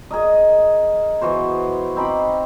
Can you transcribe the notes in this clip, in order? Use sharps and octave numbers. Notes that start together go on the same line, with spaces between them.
G#4 A#4 D#5
E3 B3 F#4 C5
C4 D#4 B5 D6